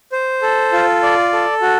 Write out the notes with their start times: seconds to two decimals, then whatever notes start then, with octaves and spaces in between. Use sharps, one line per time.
0.12 C5
0.42 A4
0.73 F4
1.03 D5
1.33 A4
1.62 F#4